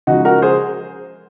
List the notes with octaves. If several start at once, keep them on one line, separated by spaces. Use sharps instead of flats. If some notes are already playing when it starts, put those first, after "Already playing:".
C#3 F3 G#3 D#4 F#4
F#4 A#4
G#4 C5